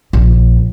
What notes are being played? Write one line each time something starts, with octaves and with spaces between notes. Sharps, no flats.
A#1